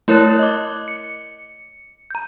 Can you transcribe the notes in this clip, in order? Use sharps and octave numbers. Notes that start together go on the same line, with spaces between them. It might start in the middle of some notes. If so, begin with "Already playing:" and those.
A3 E4 A#4 C#5 F#6 A6
D#5 D6
C#7
A#5 G6